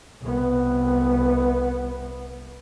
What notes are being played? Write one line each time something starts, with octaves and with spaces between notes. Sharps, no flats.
C2 B3